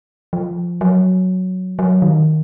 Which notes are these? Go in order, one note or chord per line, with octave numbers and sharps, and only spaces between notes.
F3
F#3
F#3
D#3